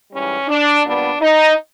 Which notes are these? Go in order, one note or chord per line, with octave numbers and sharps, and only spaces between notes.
G#2 E3 G3 C#4
D4
A#2 G3 B3 D4
D#4